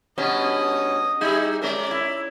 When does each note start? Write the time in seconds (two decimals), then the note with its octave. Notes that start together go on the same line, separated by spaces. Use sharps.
0.18 G2 B2 C#4 D#5 D#6
1.21 G3 D#4 E4 G4 G#4
1.62 G#3 C#4 A#4 D5
1.91 E4